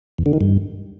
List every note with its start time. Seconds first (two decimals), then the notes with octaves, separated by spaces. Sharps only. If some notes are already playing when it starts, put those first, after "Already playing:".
0.18 E2
0.26 D3
0.33 D#3
0.41 G2